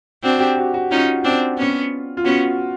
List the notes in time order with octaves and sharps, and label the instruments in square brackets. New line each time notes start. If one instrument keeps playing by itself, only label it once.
[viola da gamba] C4 D4 [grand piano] F#4
[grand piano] G4
F#4
F#4
[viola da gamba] C#4 D#4 [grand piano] F4
[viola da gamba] C4 D4
B3 C#4
[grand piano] F4
[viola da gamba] B3 C#4 [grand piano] F#4